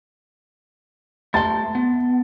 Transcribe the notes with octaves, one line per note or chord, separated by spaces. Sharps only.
A3 A5 C6 A6
B3